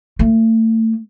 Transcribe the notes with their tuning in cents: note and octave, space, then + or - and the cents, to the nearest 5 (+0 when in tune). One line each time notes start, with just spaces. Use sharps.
A3 +35